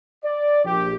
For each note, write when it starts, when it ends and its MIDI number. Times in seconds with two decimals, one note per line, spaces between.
0.23 0.63 74
0.65 0.96 34
0.65 0.96 67